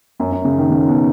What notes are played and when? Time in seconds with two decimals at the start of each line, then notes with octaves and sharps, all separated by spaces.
0.20 F#2
0.32 F#2
0.45 C#3
0.58 D#3
0.71 C#3
0.88 B2